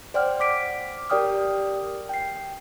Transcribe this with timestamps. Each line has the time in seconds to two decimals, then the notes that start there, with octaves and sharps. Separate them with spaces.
0.14 C5 D5 F#5 G5 F6
0.40 D6 B6 D7
1.10 G4 A#4 D5 G5 D#6 F6
2.09 G5 C7